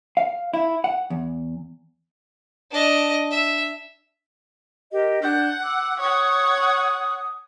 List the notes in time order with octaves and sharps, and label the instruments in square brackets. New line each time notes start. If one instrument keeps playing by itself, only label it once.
[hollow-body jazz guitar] F5
E4
F#5
E2
[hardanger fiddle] D4 D#5
E5
[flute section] G4 A#4 D#5
[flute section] D4 G6 [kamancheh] F#5
[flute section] D6 E6
[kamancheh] C#5 F#5 [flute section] D#6